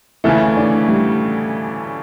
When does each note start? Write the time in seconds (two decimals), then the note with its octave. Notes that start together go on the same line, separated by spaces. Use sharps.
0.24 D2 C#3 E3 A3 E4
0.57 D4
0.88 G3